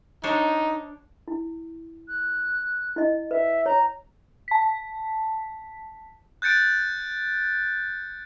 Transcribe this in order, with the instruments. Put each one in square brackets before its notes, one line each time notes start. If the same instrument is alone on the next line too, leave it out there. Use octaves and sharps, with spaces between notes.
[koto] D4 C5 C#5 [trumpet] D#4
[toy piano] E4
[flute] F#6
[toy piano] E4 D#5
[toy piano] B4 [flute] E5
[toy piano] C#5 [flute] A#5
[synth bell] A5 B6
[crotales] F#6 G6 A6 C#7 D7